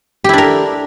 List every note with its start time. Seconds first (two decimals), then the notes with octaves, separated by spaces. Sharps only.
0.24 G4
0.29 E4
0.33 D4
0.38 A#4